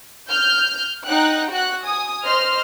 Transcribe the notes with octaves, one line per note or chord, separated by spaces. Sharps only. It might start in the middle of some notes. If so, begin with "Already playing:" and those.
F6 G6
D#4 F#5 G5 F#6
F#4 F#6
G#5 D#6
C5 D#5 C6 F6